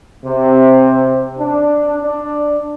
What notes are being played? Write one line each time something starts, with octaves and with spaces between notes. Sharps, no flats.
C3
D4
D4